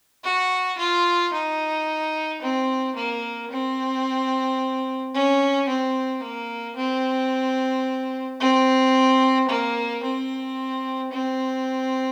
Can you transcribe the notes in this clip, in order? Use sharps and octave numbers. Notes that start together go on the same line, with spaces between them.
F#4
F4
D#4
C4
A#3
C4
C#4
C4
A#3
C4
C4
A#3
C4
C4